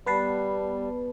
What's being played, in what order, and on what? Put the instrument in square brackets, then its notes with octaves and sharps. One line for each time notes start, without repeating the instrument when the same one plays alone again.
[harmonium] G3 [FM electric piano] B3 B4 A5 [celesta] B5 C7